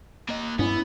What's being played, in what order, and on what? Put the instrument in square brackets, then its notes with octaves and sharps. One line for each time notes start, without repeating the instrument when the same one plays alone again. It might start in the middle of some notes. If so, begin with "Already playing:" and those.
[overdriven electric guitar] A#3 D#5
[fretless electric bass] G2 C#4 [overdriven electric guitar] B3 [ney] E4